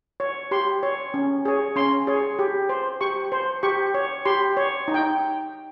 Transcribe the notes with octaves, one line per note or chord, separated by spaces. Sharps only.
C#5
G4 C6
C#5
C#4
G#4 C#5
C#4 C6
G#4 C#5
G4
C5
G4 C#6
C5
G4 C#6
C#5
G4 C6
C#5
D#4
G5